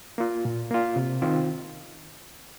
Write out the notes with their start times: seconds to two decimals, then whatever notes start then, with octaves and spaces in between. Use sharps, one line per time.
0.18 A#3 F4
0.45 A#2
0.71 A#3 F4
0.96 C3
1.22 D#3 C4 F4